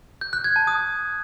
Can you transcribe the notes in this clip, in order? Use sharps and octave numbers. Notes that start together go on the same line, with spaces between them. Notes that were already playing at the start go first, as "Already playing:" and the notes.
G6
F#6
G#6
A5
D#6